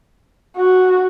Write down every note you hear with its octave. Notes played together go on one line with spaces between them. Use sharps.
F#4